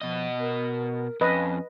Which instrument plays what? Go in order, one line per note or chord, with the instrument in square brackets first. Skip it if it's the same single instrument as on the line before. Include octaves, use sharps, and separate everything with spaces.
[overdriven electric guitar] B2 D#5 [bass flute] F3
[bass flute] A#4
[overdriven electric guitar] F2 [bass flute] C#4 [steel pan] B4 D#5